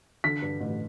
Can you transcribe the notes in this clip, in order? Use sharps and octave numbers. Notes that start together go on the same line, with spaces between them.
D3 B6
G2
A1